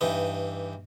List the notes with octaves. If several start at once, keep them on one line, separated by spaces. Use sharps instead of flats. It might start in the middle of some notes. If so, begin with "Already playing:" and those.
G2 E3 D#4